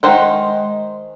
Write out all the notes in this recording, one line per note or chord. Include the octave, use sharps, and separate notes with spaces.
D#3 G#3 C5 F#5